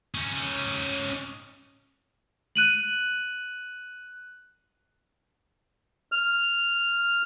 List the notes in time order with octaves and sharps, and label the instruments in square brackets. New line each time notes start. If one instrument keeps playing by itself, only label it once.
[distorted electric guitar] C#4 D#4
[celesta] F#6 D#7 F#7
[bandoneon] F6